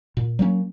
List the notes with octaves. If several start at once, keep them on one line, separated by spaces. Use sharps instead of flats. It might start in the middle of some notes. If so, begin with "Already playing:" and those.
A#2
F#3 A#3 C#4